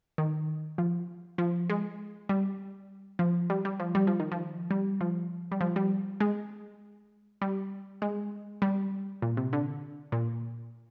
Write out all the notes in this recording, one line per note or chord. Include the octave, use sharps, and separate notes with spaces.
D#3
F3
F3
G#3
G3
F3
G3
G3
F3
G3
F3
D#3
F3
G3
F3
G3
F3
G3
G#3
G3
G#3
G3
A#2
C3
D3
A#2